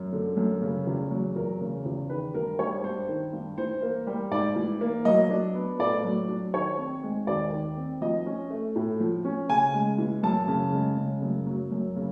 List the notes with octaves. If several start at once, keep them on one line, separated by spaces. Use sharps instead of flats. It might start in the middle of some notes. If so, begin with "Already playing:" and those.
Already playing: F#2
D3
F#2
C#3
E2
F#3
E2 A#4
C#3
E2
D#3 B4
G2 A#4
G3 C#5
G2 C5
D#3
G2
E3 C5
A#3
G3
G#2 D5
E3
A#3
F#3 D#5
D4
B3
A2 D5
F#3
D4
D#3 C#5
C4
G#3
D#2 D5
D#3
C4
F3 D#5
C#4
A3
A2
F3
C#4
C#3 G#5
G#3
E3
F#2 A5
C#3
G#3
C#3
F#2
F#3
F#2
C#3